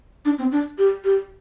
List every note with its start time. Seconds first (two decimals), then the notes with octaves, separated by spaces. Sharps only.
0.25 D4
0.38 C4
0.52 D4
0.78 G4
1.04 G4